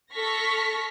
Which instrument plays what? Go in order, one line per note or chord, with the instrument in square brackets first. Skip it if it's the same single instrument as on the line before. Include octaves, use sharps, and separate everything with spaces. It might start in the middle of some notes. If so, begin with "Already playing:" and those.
[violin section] A4 A5 C#6 F6 A#6 B6